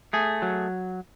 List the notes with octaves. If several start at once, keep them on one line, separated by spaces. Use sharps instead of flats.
A3 G#4
F#3